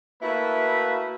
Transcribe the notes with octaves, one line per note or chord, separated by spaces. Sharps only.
A3 A#3 E4 F#4 B4 E5